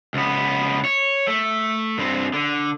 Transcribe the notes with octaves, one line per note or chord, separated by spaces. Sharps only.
C#2 B3
C#5
A3
G2 C4
D3